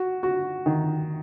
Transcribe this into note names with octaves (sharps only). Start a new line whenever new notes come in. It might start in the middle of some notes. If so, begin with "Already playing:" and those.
Already playing: F#4
F#4
D#3